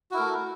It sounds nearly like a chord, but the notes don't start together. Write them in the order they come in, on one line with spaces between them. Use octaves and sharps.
F#4 E4 A#4 A3